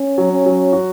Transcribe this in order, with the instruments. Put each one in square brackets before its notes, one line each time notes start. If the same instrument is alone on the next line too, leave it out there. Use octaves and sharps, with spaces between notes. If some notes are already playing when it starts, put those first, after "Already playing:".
Already playing: [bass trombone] C#4
[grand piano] F#3
[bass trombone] C#4
[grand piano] F#3
F#4